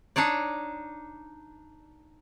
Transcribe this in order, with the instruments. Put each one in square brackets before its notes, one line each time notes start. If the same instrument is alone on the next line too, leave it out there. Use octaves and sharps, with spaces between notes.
[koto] D4 D#4 C#5 D5